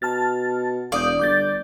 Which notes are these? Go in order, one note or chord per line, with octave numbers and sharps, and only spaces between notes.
B2 A5 F6 A6
E1 D5 F5 D#6 G6
G1 D6 G6 A6